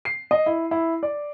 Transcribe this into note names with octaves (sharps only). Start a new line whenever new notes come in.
C7
D#5
E4
E4
D5